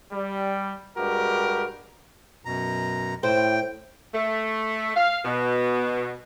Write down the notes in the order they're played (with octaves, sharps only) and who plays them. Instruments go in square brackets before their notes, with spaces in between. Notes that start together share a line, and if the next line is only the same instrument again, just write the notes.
[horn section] G3
G2 G#3 F#4 G4 A#4
[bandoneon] F#2 B2 A#5
[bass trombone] A2 [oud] C5 [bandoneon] G5
[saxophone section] A3
F5
B2